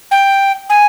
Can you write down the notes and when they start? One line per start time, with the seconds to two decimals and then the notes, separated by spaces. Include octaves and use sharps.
0.11 G5
0.70 G#5